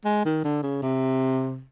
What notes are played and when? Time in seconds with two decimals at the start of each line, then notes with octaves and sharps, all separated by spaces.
0.05 G#3
0.25 D#3
0.44 D3
0.63 C#3
0.82 C3